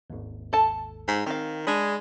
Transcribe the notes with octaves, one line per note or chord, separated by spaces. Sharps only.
G#1 D#2
A4 A5
G#2
D#3 C4 F5
G#3 D4 B5 D#6 G#6